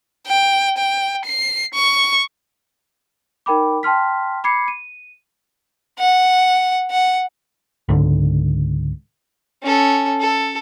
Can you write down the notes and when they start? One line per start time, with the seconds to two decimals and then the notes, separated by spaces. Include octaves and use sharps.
0.27 G5
0.78 G5
1.26 C7
1.74 C#6
3.46 D#4 A#4 G5 B5 D6
3.83 G5 A5 C6 F6 B6
4.44 B5 D6 G#6 C7 C#7
4.68 D#7
5.99 F#5
6.91 F#5
7.89 C#2 G#2 D3
9.63 C#4 A4
10.21 A4